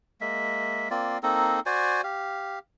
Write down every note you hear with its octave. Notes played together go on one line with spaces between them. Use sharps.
G#3 A#3 E5
A#3 C4 F4 D5
A#3 C4 D#4 A4
F#4 C5 D5 G#5
G4 F5